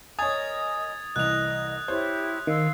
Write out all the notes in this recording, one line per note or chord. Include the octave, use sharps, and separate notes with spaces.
A#4 C#5 D#5 G#5 D#6 G#6 A6
C2 E3 D#5 F#6 F7
E4 G4 C5 C#5 G#6
D#3 F5 C6 E6